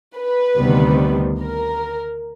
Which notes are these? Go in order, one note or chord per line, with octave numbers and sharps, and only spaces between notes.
B4
D2 C3 D#3 G3 B3
A#4